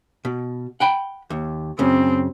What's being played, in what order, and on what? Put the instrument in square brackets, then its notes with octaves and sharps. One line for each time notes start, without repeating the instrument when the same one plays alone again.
[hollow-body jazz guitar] B2
F#5 G5 B5
D#2
[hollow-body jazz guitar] F#2 C#3 [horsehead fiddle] C4